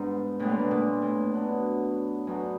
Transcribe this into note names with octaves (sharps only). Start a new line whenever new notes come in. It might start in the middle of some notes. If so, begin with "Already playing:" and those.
Already playing: G#2 D3 G3 B3
A2 D3 G3 B3
A#2
A2
A#2
A2
D3 F#3 B3 D4
F#2 D3 F#3 B3 D4